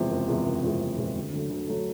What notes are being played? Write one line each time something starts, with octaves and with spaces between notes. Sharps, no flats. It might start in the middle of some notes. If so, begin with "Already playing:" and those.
Already playing: E2 C3 F3 G#3
F#1
E2 C3 F3 G#3
F#1
E2 C3 F3 G#3
F#1
E2 C3 F3 G#3
D2
D3 F#3 A3
D2
D3 F#3 A3